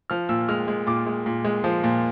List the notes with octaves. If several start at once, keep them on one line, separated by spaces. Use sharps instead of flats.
F3 F6
A#2 E6
G#3 F6
G#3
A#2 D6
G#3
A#2
G#3
F3
A#2